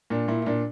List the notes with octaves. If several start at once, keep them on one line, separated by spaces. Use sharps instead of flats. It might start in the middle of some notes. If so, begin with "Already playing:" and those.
A#2 D4
A#2 E4
E4
A#2 D4